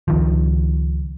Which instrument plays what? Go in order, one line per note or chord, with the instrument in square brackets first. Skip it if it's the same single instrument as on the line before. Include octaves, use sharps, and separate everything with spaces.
[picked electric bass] C#2 D#3 F3